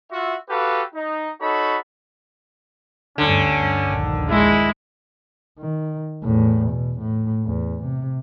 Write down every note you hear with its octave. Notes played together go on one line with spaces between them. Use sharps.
F4 F#4 E5
F#4 G4 A4 B4 F5
D#4
D#4 F#4 A4 C#5 B5
D2 G2 D3 C#4
A#1 D#2 D#3
G#3 E4
D#3
E2 A2
B2
A2
E2
C3